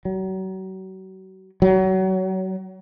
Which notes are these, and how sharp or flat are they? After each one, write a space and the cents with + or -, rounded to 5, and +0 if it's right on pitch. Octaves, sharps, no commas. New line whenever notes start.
F#3 +35
F#3 +30